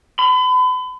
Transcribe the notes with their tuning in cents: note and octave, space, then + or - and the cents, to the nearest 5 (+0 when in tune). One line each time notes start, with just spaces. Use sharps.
B5 +40